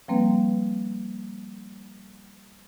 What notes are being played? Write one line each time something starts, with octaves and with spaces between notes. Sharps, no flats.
F3 G3 A#3 C4 B4